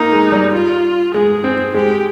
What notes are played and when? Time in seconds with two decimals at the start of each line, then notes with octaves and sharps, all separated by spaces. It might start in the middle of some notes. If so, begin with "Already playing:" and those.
Already playing: A#3 D#4
0.12 G#3
0.32 G3
0.53 F4
1.14 G#3 G#4
1.44 C4
1.74 G#3 G4